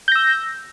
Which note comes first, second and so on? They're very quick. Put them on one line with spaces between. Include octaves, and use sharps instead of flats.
G6 A#6 E6